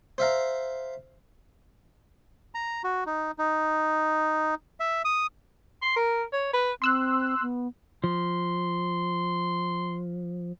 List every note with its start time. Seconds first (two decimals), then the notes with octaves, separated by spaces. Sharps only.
0.18 C5 E5 F5 A#5
2.55 A#5
2.84 F#4
3.06 D#4
3.38 D#4
4.80 E5
5.05 D#6
5.82 C6
5.96 A#4
6.33 C#5
6.53 B4
6.82 C4 C6 E6 F#6
7.42 B3
8.04 F3 C6